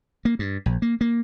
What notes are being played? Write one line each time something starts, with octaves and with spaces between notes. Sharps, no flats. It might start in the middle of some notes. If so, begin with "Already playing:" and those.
A#3
G2
A#1
A#3
A#3